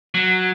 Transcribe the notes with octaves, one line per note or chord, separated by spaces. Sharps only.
F#3